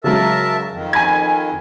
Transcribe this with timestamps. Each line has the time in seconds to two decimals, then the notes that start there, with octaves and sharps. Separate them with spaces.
0.04 C#3 F#3 G#3 A#4 E5 A5
0.72 F2 D#3
0.93 G#5 B5 G#6